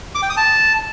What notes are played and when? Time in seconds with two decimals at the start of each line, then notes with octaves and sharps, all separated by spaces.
0.15 D6
0.22 G5
0.30 D#6
0.37 A5